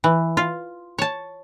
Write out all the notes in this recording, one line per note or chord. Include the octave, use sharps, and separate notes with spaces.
E3
F4
C#5 A5